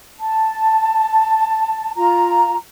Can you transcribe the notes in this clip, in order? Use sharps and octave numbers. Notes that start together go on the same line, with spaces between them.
A5
F4 A#5